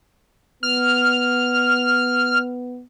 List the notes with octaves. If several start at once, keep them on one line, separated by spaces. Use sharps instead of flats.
B3 F6